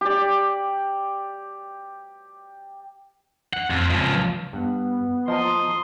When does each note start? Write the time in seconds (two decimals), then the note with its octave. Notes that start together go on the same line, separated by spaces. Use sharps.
0.01 G4 D5
3.53 F#5
3.70 F2
3.90 C#2 F3
4.53 G2 B3 F#5
5.28 F3 D#5 A5 A#5 C6 D#6